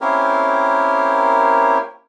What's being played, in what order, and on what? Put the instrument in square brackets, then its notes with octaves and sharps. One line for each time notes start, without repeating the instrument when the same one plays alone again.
[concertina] A#3 C4 C#4 E4 G4 A#4